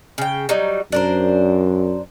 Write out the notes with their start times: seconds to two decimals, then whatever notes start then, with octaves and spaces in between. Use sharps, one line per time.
0.18 C#3 G5
0.49 F#3 G3 D#4
0.92 F#2 D4 A#4 C5